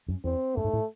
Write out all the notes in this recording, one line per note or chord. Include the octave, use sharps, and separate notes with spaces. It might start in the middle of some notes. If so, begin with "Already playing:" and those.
F#2
E2 C4
F#2 A3
G#2
A2